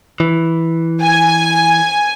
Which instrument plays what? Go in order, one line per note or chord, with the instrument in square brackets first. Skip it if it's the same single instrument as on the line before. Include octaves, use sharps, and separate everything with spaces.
[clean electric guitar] E3
[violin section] G#5